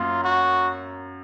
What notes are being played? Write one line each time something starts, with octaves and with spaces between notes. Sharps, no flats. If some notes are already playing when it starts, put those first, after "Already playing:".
Already playing: F#2 A#3 F4
F#4